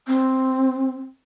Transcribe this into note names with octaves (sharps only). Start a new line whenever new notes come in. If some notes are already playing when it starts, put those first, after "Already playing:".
C4